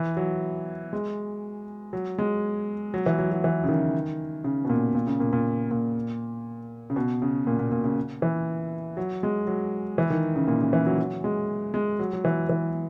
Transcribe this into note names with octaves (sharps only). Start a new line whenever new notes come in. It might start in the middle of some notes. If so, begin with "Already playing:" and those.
Already playing: E3
F#3
G#3
F#3
G#3
F#3
E3
F#3
F#3
E3
C#3
D#3
C#3
B2
A#2
A#2
C#3
A#2
A#2
A#2
C#3
B2
C#3
A#2
A#2
A#2
C#3
E3
F#3
G#3
F#3
E3
D#3
C#3
A#2
C#3
E3
F#3
F#3
G#3
G#3
F#3
F#3
E3
E3